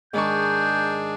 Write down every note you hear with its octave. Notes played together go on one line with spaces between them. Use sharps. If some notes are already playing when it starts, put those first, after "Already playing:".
G#2 D#3 D4 G#4 C#6 G6